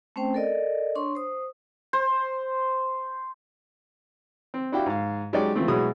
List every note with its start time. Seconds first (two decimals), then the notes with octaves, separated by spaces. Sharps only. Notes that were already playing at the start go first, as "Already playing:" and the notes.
0.16 A3 C4 C#4 C5 G5
0.34 A4 A#4 D5 D#5
0.95 D4 C#5 C6 C#6
1.15 C5 D#6
1.93 C5
4.54 C4
4.72 D4 E4 F#4 G4 F5 G5
4.86 G#2 F5
5.33 F#3 G#3 C#4 D#4 G4 D5
5.55 C#3 E3 F3 A3 C4
5.68 B2 F#3 G#3 E4 G#4 D#6